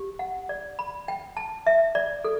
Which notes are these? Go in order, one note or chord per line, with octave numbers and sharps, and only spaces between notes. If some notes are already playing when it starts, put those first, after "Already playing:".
Already playing: G4
F#5
D5
B5
G5
A5
E5
D5
A4